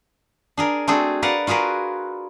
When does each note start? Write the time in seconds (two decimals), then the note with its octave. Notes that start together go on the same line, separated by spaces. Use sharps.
0.57 D4 G#4 A#4
0.88 A3 C4 D4 F#4 G#4
1.22 A#4 B4 D5 F5 F#5
1.47 F4 F#4 G#4 A#4 B4